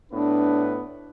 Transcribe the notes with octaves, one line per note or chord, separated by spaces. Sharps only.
A2 B3 D4 B4